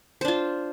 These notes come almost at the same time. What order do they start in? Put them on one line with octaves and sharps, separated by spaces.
C5 D4 F4